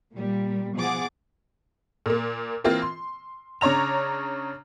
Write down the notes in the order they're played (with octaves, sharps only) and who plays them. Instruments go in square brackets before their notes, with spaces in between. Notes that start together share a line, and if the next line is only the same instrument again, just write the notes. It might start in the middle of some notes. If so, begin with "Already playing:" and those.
[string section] A#2 G3
B2 F3 G#4 F#5 D6 A6
[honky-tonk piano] A#2 A#3
E3 A#3 C4 F4
C6
C#3 D4 C#5 A#5 F7